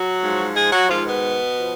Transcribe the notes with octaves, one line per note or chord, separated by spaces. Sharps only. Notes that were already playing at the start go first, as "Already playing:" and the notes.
Already playing: F#3 F#4
G#2 F3
G#3 G#4
F#3 F#4
G#2 D#3 F3 F4
B2 B3
F3